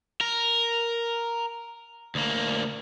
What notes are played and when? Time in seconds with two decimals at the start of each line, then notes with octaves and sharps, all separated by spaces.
0.21 A#4
2.15 D2 A#3